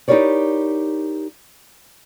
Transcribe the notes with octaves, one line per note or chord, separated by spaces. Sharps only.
D#4 E4 G4 A#4 C#5 D5